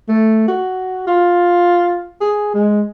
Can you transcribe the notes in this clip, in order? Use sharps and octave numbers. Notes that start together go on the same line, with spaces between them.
A3
F#4
F4
G#4
G#3